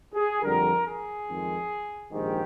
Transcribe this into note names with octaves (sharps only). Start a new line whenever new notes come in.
G#4
F2 D3 G3 A#4
G#4
F2 D#3 G#3
A#1 G#2 D#3 G4